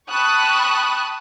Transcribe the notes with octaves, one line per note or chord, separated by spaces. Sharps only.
G5 A5 B5 C#6 D#6 F#6